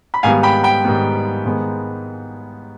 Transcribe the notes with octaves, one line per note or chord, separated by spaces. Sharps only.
B5
G#2 D#3 G3 B3 F5 G#5
G5 B5
G5 B5
G#2 D#3 G3 B3
G#2 D#3 G#3 B3